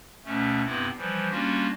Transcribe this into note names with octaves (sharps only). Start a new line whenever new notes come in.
D2 B2 A3 C#4
G2 C3 B3 C4 E4
E3 F3 G3
G3 A#3 C#4 D4 F4 F#4